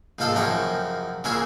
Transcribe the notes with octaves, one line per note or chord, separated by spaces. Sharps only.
A#1 G#2 F3 F4 A4 F5
F#2 C#3 F3 D#4 G4 C#5
A#2 C#3 C#4 E4 G#4 F5